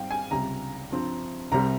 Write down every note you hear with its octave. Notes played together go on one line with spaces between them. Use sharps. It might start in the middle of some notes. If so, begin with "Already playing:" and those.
Already playing: G#2 G3 C4 F5 G5
G#5
C#2 C3 G3 A#5
G2 F3 C4
C2 C3 G3 C4 A#5